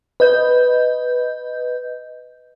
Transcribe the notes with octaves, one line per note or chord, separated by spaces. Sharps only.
B4 D#5 G6